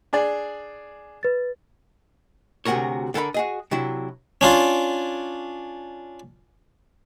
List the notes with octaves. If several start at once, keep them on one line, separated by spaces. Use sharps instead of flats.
D4 G#4 D5
B4 A6
D2 C3 F#4 G#4 A#4 C#5
D3 A4 A#4 G5 B5
F#4 G#4 D#5
C3 F#3 D4 E4
C#4 D4 F4